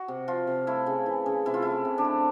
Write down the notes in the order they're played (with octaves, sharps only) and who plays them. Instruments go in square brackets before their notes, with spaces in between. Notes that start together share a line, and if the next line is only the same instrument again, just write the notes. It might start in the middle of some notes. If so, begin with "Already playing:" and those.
Already playing: [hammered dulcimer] F#4
C3
F3 F4
C3
A3 E4
C#3
E3
C#3
C3 E4
F4
A3 E4
C3
D4
A3